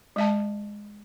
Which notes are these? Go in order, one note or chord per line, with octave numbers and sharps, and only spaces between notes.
G#3 E5 A5